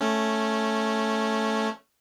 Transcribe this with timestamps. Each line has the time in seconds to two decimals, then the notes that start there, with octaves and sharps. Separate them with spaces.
0.01 A3 C#4